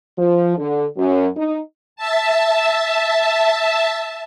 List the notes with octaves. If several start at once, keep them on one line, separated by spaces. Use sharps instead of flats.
F3
D3
F#2
D#4
E5 A5